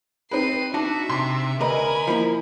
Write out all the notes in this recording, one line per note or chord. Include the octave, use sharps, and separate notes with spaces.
C4 D#4 B4 C7 D#7
D4 D#4 F#4 E5 A5
C3 C6
D2 A#4 B4 D#5 G#5 A#5 B5
F3 A#3 E4